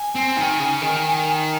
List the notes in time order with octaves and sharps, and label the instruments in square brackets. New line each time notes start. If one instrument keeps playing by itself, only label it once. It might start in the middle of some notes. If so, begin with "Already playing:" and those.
Already playing: [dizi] G#5
[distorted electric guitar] C4
D#3
C#3
D#3